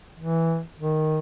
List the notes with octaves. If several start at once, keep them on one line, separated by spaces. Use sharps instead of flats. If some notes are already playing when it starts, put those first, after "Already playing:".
E3
D#3